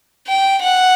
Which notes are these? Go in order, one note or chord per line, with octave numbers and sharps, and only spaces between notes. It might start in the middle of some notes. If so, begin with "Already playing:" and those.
G5
F#5